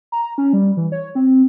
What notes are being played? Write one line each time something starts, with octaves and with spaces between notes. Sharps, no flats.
A#5
C#4
G3
E3
C#5
C4